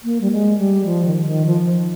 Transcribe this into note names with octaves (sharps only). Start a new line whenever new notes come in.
A#3
G3
G#3
G3
F3
D#3
D#3
F3